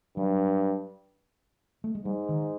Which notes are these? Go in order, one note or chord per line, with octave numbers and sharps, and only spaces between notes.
G2 F#3
A3
G#3
G#2 G3
D#3